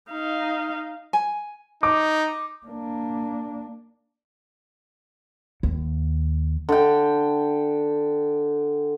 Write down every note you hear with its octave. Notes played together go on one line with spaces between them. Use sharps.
D#4 F5
G#5
D#4 D6
A#3 D4
D#2
D3 G5